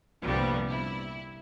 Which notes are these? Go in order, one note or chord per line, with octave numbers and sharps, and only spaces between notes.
C2 G2 A#2 F3 G3 B3
E4